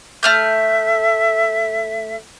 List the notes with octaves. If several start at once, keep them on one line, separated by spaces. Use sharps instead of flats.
A3 E5 F6 G6